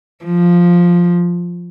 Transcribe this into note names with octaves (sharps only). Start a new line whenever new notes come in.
F3